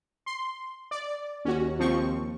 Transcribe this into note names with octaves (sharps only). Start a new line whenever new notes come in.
C6
D5
D#2 C#4 F#4
F3 C4 C#6